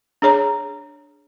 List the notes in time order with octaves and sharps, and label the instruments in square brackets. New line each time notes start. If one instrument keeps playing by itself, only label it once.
[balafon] D4 G#4 C#5 A#5